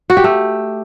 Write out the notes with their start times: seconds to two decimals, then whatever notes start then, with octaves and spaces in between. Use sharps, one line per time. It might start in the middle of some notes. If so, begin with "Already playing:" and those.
0.10 F#4
0.17 G4
0.24 A3